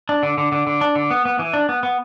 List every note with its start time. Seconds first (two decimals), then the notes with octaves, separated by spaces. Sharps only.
0.09 D4
0.23 D3
0.38 D3
0.52 D3
0.67 D3
0.81 D4
0.96 D3
1.11 B3
1.25 B3
1.39 E3
1.54 D4
1.69 B3
1.83 B3